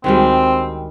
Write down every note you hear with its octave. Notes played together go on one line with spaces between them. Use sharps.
D2 D#3 G3 G#3 C4 F#4 G#5